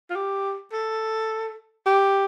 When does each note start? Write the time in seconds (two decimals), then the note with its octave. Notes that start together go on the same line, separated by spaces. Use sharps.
0.10 F4
0.15 G4
0.72 A4
1.86 G4